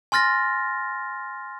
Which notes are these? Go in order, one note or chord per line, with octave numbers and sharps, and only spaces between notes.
G#5 C6 F6 A6 A#6